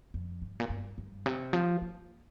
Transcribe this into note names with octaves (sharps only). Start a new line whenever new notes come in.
F2
G2
A#2
G2
G2
C3
F3
A#3